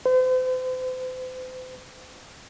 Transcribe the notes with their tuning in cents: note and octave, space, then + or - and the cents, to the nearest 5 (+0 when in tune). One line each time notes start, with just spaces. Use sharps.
C5 -40